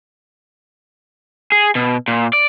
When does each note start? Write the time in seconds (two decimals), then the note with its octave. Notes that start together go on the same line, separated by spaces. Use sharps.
1.52 G#4
1.75 B2
2.08 A#2
2.33 D5